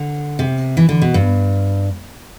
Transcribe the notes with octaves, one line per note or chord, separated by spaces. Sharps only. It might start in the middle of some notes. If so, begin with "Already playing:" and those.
Already playing: D3
C3
E3
D3
B2
G2